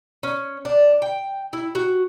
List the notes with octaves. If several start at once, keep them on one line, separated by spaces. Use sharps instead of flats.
C#4
D4
G5
E4
F#4